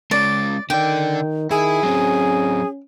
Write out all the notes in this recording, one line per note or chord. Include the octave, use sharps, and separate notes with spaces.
G#3 C#4 D5
D3 D#3 D5 G5
D#3 E4 G#4
F#3 C4 C#4